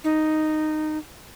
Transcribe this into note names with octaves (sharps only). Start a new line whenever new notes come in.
D#4